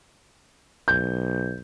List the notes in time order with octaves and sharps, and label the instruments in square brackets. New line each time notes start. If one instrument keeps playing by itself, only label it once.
[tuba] B1 [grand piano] G6